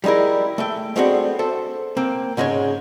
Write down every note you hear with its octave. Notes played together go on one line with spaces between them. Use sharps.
G3 G#3 D#4 E4 A#4
A3 E5 G5
G#3 A3 B3 C4 D4 F#4
A4 C5 E5
A#3 C4
G#2 C#3 G#3 B4 C#5